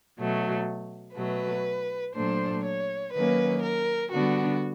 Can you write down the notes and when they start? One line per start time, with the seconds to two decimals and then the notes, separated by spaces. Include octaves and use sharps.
0.19 B2 F#3 A3
1.16 B2 F#3 A3 B4
2.15 A#2 F#3 A3 D4 C5
2.65 C#5
3.14 D#3 F#3 A#3 C#4 B4
3.63 A#4
4.12 D3 G3 B3 D4 F#4